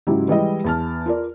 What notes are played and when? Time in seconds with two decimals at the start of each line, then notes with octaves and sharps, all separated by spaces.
0.07 G#2 C#3 F#3 E4 G4
0.28 E3 G3 G#3 E4 D#5
0.64 E2 A5 F6
1.06 F4 A#4 D5